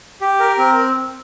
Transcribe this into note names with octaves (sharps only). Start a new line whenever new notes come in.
G4
A#4
C4